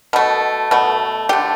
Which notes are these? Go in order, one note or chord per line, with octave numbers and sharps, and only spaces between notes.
B2 A3
B2 A3
D3 A3 G4